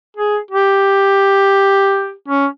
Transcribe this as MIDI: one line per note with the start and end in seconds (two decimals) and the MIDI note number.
0.17 0.38 68
0.51 2.12 67
2.28 2.46 61